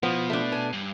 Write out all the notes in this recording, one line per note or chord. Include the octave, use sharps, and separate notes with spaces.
B2 F3 B3
A3 D4
G#5
G2